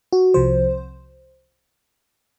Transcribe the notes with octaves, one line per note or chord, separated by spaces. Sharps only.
F#4
C2 C3 F3 C5